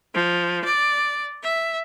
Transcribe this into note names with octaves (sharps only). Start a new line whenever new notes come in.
F3
D5
E5